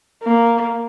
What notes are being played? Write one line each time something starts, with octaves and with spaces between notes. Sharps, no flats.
A#3